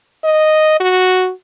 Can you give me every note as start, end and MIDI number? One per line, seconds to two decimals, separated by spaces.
0.24 0.79 75
0.80 1.31 66